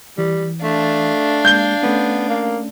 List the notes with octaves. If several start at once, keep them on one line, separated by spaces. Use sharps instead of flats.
E3 G3
A3 D4 F5
G#3 A#3 G6 G7
A3 B3 C#4
A#3